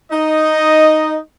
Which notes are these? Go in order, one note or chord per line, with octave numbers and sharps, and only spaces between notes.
D#4 D#5